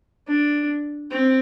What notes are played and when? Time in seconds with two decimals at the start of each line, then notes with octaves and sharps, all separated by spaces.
0.28 D4
1.11 C4